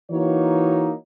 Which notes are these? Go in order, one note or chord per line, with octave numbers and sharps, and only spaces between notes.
E3 A#3 D#4 F#4 C#5